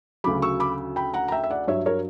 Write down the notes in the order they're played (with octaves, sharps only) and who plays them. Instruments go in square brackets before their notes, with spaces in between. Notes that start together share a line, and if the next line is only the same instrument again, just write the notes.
[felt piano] D2 C#3 F#3 B5 D6
C#6 E6
B5 D6
G5 B5
F#5 A#5
A#5
E5 G5
E5
D5 F#5
G2 F#3 C#5 E5
A#4 C#5